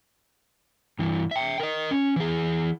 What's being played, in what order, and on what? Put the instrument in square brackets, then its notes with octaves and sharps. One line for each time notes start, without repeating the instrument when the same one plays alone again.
[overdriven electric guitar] G2 E3
E5 G5
A#4 D#5
C#4
E3 G#4